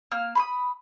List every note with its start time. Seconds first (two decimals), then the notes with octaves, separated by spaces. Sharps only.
0.12 A#3 F6
0.35 B5 C6 D#6